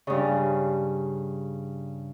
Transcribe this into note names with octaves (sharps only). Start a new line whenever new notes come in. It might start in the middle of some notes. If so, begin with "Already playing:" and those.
G2 C#3